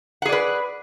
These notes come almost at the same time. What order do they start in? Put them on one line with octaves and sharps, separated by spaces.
F#5 G#4 D5 B4